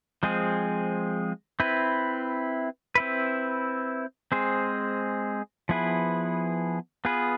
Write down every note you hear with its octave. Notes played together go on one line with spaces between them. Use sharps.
F3 G#3 C4 G#4
C4 E4 B4
C4 E4 B4
G#3 C4 G#4 C5
F3 B3 E4 G#4 B4
B3 F4 G#4 B4